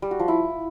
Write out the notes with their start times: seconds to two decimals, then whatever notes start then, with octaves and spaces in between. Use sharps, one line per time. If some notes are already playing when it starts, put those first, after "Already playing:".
0.02 G3
0.11 F#4
0.19 F3
0.28 E4